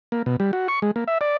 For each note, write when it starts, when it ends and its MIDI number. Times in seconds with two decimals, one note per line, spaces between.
0.12 0.22 58
0.26 0.36 47
0.40 0.51 55
0.53 0.68 66
0.68 0.80 85
0.82 0.91 56
0.96 1.04 58
1.08 1.18 76
1.21 1.37 74